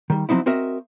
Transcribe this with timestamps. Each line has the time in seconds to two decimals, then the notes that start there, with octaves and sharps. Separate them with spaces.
0.10 D#3 G3
0.29 F3 F#3 C4 D#4 E4
0.46 C4 F#4 A#4 D#5 E5